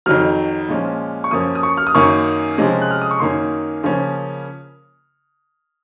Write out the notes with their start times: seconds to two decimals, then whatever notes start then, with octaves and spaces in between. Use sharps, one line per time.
0.06 F2 D#3 F#3 F6
0.69 A#2 F3 G#3 C#4
1.24 C#6
1.31 F#2 F3 A#3 C#4 D#6
1.55 D#6
1.63 C#6
1.77 F6
1.87 D#6
1.95 F#2 D#3 A#3 C#4 C#6
2.58 C3 F3 G#3 C#4
2.81 F#6
2.91 F6
3.02 D#6
3.11 C#6
3.20 F#2 D#3 A#3 C#4 C6
3.83 C#3 F3 A#3 C#4